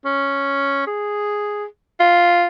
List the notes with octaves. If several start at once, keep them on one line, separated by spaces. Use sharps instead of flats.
C#4
G#4
F4